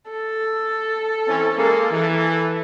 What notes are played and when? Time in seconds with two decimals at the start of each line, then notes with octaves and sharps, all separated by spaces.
0.10 A4
1.27 E3 C4 C#4
1.57 G#3 A#3
1.91 E3